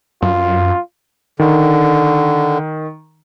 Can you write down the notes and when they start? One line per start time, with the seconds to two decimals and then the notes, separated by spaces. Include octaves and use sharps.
0.22 F#2 F4
1.39 D3 D#3